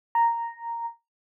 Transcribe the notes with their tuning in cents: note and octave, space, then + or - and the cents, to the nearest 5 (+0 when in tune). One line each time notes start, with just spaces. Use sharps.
A#5 -5